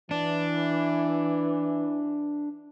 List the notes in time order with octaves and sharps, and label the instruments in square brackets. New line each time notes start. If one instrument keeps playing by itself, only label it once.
[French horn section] E3 [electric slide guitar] D4